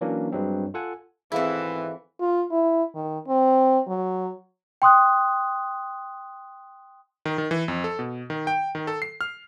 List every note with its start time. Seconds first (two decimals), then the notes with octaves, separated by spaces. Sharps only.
0.01 E3 F#3 A#3 C#4 D4
0.32 G2 F#3 G#3 C4
0.74 F4 A4 F#5 G#5
1.32 G#1 B2 E3 C4 E4 G#4 A4 F5
2.20 F4
2.51 E4
2.95 D#3
3.28 C4
3.88 F#3
4.82 G5 C6 D#6 F#6
7.25 D#3
7.38 D#3
7.51 E3
7.68 F2
7.84 A4
7.99 B2
8.30 D#3
8.47 G5
8.75 D#3
8.87 A4
9.02 C7
9.21 F6